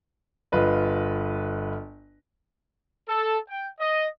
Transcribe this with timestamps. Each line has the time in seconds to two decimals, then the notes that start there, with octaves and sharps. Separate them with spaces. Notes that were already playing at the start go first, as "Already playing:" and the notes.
0.52 G1 F4 B4 D#5
3.09 A4
3.49 G5
3.80 D#5